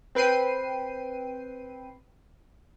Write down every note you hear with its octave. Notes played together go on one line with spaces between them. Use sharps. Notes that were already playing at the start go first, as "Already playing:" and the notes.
C4 B4 G5 C7 D#7